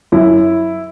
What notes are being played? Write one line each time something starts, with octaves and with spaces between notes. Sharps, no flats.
F#2 E4